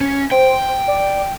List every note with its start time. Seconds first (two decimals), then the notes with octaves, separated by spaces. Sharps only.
0.01 C#4
0.31 C5 G5
0.88 D5